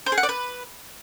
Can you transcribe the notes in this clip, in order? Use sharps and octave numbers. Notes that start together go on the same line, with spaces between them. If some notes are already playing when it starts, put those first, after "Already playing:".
C5
G#4
F#5
D5
B4